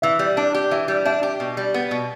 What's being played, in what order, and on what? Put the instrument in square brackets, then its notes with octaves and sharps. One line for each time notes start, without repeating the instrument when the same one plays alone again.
[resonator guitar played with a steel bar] E3 [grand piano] E5
[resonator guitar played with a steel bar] G3
D4
G4
[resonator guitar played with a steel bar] E3 [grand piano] E5
[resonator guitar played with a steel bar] G3
[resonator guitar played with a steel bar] D4 [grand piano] E5
[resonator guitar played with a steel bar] G4
B2
G3
B3
B2